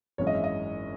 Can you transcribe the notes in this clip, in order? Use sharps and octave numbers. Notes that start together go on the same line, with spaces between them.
G#1 F#2 E3 G#3 C#4 C#5
D#5
E5
D#5